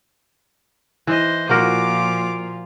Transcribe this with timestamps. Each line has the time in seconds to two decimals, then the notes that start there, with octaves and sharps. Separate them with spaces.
1.07 E3 C5 D#5
1.49 A#2 F3 A#3 F4 F#4 A#4 D6